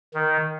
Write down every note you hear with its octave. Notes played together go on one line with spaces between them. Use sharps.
D#3